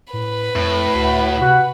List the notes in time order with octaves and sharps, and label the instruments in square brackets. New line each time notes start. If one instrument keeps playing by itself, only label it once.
[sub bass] A2 [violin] B4 B5
[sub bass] F2 [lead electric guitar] A2
[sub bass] D2 [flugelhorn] F#4
[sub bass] C3 [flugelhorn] F#4